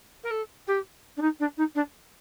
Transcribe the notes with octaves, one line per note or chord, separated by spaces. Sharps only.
A#4
A4
G4
D4
D#4
D4
D#4
D4